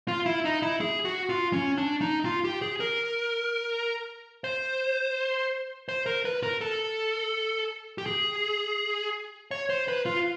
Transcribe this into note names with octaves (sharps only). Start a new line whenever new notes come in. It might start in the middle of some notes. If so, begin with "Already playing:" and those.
F4
E4
D#4
E4
G#4
F#4
F4
C#4
D4
D#4
F4
G4
G#4
A#4
C5
C5
A#4
B4
A#4
A4
G4
G#4
C#5
C5
B4
F4